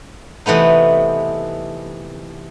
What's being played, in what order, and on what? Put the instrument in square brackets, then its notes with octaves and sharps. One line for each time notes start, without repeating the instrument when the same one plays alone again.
[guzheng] C3 E3 A3 B3 D#4